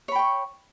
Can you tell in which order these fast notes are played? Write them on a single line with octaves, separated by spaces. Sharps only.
C#5 B5 G5 C#6